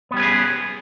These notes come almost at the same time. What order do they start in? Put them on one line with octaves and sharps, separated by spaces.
B3 G3 C#4 B4 G#4